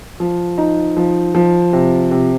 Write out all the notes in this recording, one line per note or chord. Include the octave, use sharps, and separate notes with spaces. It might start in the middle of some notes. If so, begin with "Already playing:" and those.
F3
D#4
F3
F3
C3
C3